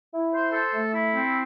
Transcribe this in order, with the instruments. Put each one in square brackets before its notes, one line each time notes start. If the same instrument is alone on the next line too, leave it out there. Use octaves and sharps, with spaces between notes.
[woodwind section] E4
C5
A4
A3
E4
C4